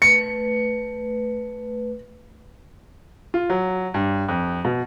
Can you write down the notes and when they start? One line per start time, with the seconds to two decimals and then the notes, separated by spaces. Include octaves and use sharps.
0.02 A3 B4 C#7
3.34 F4
3.50 F#3
3.94 G2
4.29 F2
4.65 B2